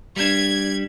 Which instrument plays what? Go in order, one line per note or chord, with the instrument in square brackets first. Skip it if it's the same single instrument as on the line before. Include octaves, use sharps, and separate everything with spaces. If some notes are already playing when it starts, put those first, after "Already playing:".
[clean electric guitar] G3 D4 [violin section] G#6